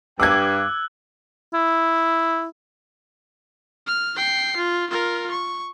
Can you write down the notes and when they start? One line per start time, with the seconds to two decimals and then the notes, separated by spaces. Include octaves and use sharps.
0.20 G2 G5 D6 E6 F#6 G#6
1.53 E4
3.87 F6
4.16 G5 C7
4.57 F4
4.90 F4 A#4
5.31 C#6